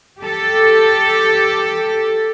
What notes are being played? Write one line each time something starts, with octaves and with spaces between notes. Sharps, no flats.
G4 A4